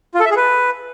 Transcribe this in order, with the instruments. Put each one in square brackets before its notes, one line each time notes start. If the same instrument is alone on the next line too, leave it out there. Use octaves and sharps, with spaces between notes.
[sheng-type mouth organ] F4
A4
E5
G#4
B4